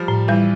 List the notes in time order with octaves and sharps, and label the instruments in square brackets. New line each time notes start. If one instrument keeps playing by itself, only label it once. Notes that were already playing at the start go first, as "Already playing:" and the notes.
Already playing: [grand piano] F3 G3
[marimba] A2
[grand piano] E3 [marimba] G3